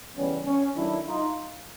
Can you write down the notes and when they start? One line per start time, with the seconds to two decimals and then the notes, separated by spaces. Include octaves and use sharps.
0.15 C#3 E3 G3 B3 C#4
0.46 C#4
0.76 D#3 F#3 A3 D4 E4
1.05 D#4 F4